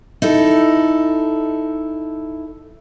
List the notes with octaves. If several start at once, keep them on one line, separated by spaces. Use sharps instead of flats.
D#4 E4 A4